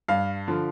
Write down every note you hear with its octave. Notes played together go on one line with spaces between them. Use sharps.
G2 F5
D3 F3